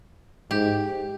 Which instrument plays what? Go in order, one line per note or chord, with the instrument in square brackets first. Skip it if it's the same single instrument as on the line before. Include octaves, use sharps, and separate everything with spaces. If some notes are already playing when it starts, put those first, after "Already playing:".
[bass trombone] G#2 [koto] G4